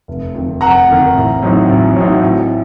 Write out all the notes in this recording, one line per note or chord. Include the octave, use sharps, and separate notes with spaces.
F1
F2 D#3
F1 F#5 A#5
F2 D#3
A1
A2 F#3 C4 D#4
A1
A2 F#3 C4 D#4
A2